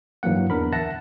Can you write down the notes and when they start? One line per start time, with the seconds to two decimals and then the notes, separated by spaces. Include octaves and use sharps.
0.23 G2 E3 F#3 A#3 F#5
0.50 E2 D4 A#4 B5
0.73 E5 F#5 A5 F#6 A#6